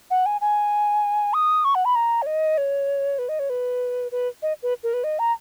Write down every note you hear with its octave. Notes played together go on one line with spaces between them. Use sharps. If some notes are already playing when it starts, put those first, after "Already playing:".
F#5
G#5
G#5
D#6
C#6
F#5
B5
A#5
C#5
D#5
C#5
B4
D#5
C#5
B4
B4
D#5
B4
A#4
B4
D#5
A#5